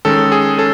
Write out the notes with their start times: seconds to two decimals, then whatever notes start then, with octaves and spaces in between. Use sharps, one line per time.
0.05 D#3 G#3 C#4 A4
0.32 G#4
0.58 C#4 A4